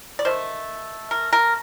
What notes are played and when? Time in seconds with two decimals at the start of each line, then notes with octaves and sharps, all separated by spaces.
0.19 D5
0.25 D#3 A3 C5
1.11 A#4
1.33 A#4